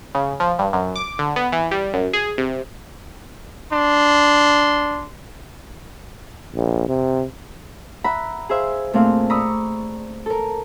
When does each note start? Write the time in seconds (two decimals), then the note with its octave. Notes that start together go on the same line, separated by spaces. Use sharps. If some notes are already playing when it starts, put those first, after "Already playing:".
0.15 C#3
0.40 F3
0.59 G2
0.73 F#2
0.96 D6
1.19 D3
1.36 B3
1.52 E3
1.71 G3
1.94 F#2
2.13 G#4
2.38 C3
3.71 D4 C6
6.55 A#1
6.89 C3
8.04 E5 F#5 A#5 B5 E6
8.49 G#4 C5 E5 F5
8.94 A#2 A3 C4 G#4 F5
9.30 D5 A#5 B5 C#6 D#6 E6
10.26 A4 A#4